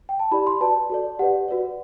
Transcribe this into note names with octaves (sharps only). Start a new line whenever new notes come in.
G5
A5
E4 G4 D5 B5
C6
F#4 B4 D5 A5
F#4 A4 D5
G4 B4 D5 F#5
F#4 B4 D5